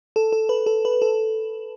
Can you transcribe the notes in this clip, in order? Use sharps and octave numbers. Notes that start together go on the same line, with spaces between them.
A4
A4
B4
A4
B4
A4